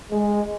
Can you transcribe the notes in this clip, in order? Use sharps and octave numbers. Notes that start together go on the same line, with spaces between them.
G#3